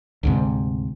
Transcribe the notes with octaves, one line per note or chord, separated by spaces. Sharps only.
D2 G#2 C3